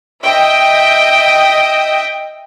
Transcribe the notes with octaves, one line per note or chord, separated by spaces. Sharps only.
D#5 E5 G5